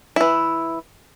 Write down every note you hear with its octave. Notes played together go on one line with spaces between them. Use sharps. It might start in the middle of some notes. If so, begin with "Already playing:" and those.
E3 E4